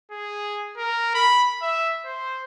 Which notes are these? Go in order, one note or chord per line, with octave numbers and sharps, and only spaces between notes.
G#4
A#4
B5
E5
C5